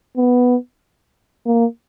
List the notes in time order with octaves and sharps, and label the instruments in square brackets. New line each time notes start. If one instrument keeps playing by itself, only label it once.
[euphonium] B3
A#3